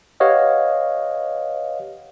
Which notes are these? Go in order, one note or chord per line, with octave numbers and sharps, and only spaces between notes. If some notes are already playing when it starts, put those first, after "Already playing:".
G4 B4 C#5 D#5 F5 F#5